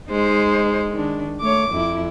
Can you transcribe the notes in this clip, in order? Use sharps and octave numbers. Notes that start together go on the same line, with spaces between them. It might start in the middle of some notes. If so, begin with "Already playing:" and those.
G#3 D#4 C5
D#3 D4
A3 C#5 D6
F2 E4